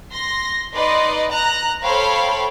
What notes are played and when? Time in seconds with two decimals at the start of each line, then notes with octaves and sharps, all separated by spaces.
0.11 C6 A#6
0.74 D#4 B4 D5 D#5 C6
1.31 A#5 F#6
1.83 A4 C5 C#5 F5 G5 B5